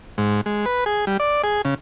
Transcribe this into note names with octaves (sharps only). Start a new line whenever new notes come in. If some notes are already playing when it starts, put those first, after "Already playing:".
G#2
G#3
B4
G#4
G3
D5
G#4
C#3